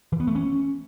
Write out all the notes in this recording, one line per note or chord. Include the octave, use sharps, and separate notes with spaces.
E3
B3
A3
C#4